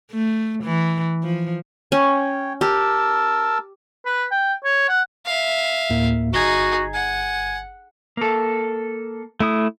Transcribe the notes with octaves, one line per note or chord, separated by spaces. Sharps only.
A3
E3
F3
C#4 C#5 G5
G4 A#4 A5 E6
B4
G5
C#5
F#5
E5 F5
D2 A2 A#3
G1 D#4 F#4 G#4 G#6
F#5 G#5
A#3 A4
A3 E4 D#6